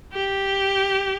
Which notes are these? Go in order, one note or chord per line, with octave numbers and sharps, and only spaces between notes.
G4